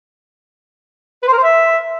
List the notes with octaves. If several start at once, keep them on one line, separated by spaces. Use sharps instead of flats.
B4
C5
A#4
C5
E5